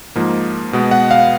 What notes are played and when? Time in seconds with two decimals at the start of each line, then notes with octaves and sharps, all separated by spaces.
0.16 G#2 F3 A#3
0.73 B2 G#3 B3
0.91 F#5
1.11 F5